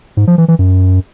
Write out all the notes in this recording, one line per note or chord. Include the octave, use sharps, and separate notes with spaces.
G#2
F3
E3
E3
F#2